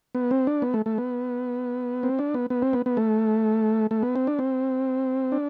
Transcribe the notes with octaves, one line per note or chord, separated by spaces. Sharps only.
B3
C4
D4
B3
A3
A3
B3
C4
D4
B3
B3
C4
B3
B3
A3
A3
B3
C4
D4
C4
D4